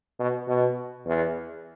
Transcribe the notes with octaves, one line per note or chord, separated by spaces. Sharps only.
B2
B2
E2